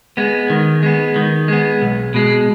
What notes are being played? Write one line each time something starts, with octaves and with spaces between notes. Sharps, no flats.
G#3 B3
D#3
G#3 B3
D#3
G#3 B3
B1
B2 G#3